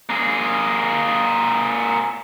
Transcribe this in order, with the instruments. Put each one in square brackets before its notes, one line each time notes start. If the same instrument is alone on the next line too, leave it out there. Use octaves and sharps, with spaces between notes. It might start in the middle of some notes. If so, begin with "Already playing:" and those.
[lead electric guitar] A#3 G#4